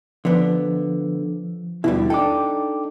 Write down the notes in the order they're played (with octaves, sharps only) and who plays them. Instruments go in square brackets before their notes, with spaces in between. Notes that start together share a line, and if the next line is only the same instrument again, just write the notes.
[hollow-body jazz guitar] D3 B3 [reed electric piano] F3
[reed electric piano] D#2 E4 [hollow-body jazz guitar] B2 D3 G3
[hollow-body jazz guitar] D4 D#4 A4 [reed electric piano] G5 D6